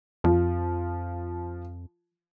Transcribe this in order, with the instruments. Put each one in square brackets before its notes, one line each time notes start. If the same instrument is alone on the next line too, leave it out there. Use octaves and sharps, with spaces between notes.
[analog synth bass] F2 [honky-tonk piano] F3